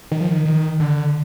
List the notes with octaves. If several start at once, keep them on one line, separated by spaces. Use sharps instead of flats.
D#3
F3
D#3
D#3
D3